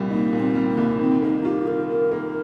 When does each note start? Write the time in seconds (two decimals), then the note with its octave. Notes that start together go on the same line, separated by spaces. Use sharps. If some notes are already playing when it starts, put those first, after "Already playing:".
Already playing: C2 A#2 G3
0.10 A#3 D#4
0.33 A#2
0.40 C4
0.55 G3
0.69 A#3
0.77 C2
0.99 D#3 C4
1.22 A#3 D#4
1.44 F4 G4
1.67 D#3 A#4
1.89 D#3 A#4
2.11 A#3